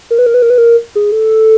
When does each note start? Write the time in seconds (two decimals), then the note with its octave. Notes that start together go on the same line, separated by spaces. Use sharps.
0.11 A#4
0.19 B4
0.26 A#4
0.34 B4
0.42 A#4
0.50 B4
0.58 A#4
0.95 G#4
1.12 A4